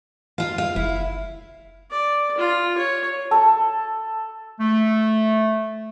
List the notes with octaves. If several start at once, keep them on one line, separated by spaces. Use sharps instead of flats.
F4 F5
F5
F#1 E4
D5
F4
C#5
A4 A5
A3